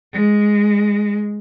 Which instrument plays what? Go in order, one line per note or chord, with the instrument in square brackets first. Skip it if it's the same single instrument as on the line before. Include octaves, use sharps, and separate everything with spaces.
[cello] G#3